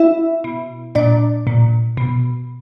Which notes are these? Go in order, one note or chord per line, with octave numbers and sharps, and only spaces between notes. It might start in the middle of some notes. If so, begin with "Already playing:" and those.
Already playing: E4 E5
B2
A#2 D4 D5
A#2
B2